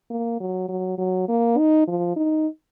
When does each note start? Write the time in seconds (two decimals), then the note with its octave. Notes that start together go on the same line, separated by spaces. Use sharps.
0.10 A#3
0.40 F#3
0.69 F#3
0.98 F#3
1.28 A#3
1.58 D#4
1.88 F3
2.16 D#4